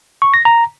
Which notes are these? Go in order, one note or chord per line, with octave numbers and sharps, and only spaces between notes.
C#6
A#6
A#5